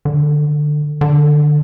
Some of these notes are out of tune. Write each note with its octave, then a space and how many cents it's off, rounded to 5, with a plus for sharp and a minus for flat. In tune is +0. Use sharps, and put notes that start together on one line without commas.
D3 +20
D3 +20